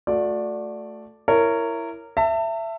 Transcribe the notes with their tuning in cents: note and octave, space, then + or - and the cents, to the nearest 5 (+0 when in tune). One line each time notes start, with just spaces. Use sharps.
A3 +0 F#4 -35 D5 +0
E4 +15 A#4 -15 C#5 +0
E5 +15 A5 +35